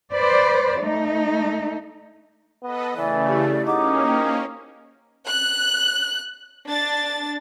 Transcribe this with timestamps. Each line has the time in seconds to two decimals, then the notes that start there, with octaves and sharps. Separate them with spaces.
0.13 B4 C5 D5
0.81 A3 D#4
2.63 B3 A4 B4 D#5
2.96 C#3 E3 A3 D5
3.28 E4 G4
3.66 A#3 C#4 D#4 G#4 D#5 F#5 D6
4.08 C5 G5
5.27 F#6
6.69 D4 A6